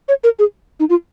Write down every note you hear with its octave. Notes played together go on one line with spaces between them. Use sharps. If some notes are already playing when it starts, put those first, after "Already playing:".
C#5
A#4
G#4
D#4
F4